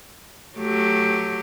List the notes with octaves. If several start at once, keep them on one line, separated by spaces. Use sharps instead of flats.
F#3 A3 G4